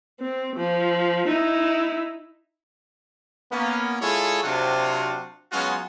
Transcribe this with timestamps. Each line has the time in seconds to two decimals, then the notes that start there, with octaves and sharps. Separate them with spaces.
0.20 C4
0.56 F3
1.28 D#4 E4
3.51 A#3 B3 C#4
4.01 G#3 E4 F4 G#4 A4 C#5
4.44 C3 F#3 C4 D4 F4 F#4
5.52 F#3 G#3 B3 C#4 F4 F#4